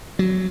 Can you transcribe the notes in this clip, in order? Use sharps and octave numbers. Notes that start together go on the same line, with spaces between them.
F#3